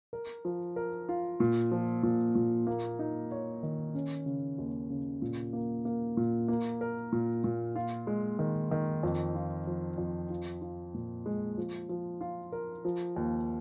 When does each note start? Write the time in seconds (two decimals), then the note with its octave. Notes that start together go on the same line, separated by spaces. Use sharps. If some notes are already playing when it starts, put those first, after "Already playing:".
0.13 A#4
0.45 F3
0.76 A#4
1.09 F4
1.40 A#2
1.72 F3
2.03 A#2
2.35 A#2
2.67 A#3
2.99 D#4
3.31 C#5
3.63 D#3
3.95 C#4
4.26 C#3
4.58 D#2
4.90 C#3
5.22 A#2
5.53 A#3
5.85 A#3
6.17 A#2
6.48 A#3
6.81 A#4
7.12 A#2
7.44 A#2
7.76 F4
8.07 G#3
8.39 D#3
8.71 D#3
9.03 F2
9.35 F4
9.67 F3
9.98 F2
10.30 F4
10.62 F4
10.94 A#2
11.26 G#3
11.58 F3
11.89 F3
12.21 F4
12.52 A#4
12.85 F3
13.16 D#2